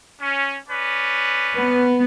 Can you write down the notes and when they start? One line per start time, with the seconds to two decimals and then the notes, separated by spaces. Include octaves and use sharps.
0.22 C#4
0.69 C#4 B4 D5
1.57 B3